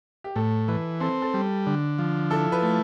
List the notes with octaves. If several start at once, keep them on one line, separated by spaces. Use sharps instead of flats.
G4
A2 A4
E3 B4
C4 A4
A4
G3
D3
F3
E4 A4
B4
A3